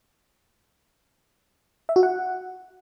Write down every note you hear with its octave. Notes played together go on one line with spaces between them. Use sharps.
E5
F#4
F#5